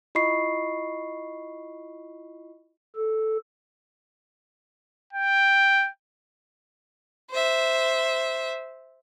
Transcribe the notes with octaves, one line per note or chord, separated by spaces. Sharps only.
E4 F4 D#5 B5 C#6 C7
A4
G5
C5 E5